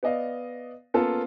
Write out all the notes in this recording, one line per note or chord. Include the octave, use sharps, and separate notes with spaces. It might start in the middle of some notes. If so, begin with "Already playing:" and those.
B3 D5 D#5 F5
A#3 B3 C#4 F4 A4 A#4